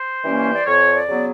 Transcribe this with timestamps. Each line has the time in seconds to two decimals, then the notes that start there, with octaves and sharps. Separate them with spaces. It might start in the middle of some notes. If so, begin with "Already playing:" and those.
Already playing: C5
0.24 E3 G3 A#3 C#4
0.54 D5
0.66 F2 C#5
0.95 D5
1.09 C#3 F#3 B3